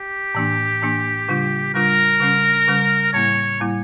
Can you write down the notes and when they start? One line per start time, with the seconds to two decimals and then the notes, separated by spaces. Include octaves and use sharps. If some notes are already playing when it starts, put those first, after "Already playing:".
Already playing: G4
0.35 A2 E3 A#3 D4
0.82 A2 E3 A#3 D4
1.29 C#3 G3 D4 F4
1.74 C#3 G3 D4 F4 A#4
2.21 C#3 G3 C#4
2.68 C#3 G3 C#4
3.14 A2 G3 A#3 E4 C#5
3.60 A2 G3 A#3 E4